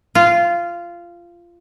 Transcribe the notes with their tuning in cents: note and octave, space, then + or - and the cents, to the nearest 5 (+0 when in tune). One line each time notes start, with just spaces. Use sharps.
F4 -15